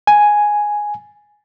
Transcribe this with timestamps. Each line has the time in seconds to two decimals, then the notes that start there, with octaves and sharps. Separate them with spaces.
0.07 G#5